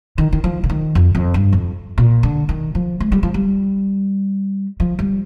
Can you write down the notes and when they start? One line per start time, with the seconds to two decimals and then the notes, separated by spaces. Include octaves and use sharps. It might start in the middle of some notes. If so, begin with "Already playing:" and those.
0.18 D#3
0.33 D#3
0.44 F3
0.64 D3
0.70 D#3
0.95 F2
1.15 F2
1.34 G2
1.53 F2
1.98 A#2
2.23 D3
2.49 D#3
2.75 F3
3.00 G#3
3.12 G3
3.23 F3
3.34 G3
4.80 F3
4.99 G3